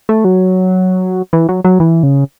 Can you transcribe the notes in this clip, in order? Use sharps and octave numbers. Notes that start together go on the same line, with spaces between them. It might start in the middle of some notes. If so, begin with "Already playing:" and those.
A3
F#3
E3
F#3
F#3
E3
C#3